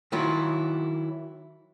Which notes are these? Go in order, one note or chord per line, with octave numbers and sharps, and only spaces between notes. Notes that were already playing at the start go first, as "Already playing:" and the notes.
D#3 F#3 E4 F4